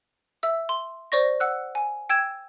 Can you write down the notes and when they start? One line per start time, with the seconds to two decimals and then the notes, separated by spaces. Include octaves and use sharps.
0.43 E5 E6
0.69 C6
1.12 C5 D5 C#6 A#6
1.40 F#5 E6 F#6
1.75 G#5
2.10 G5 E6 G#6 E7